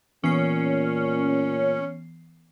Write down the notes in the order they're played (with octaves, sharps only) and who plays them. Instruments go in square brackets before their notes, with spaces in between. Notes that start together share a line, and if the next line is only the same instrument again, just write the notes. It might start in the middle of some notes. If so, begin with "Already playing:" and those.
[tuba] A#2 [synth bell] E3 B3 C7 [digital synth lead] C#4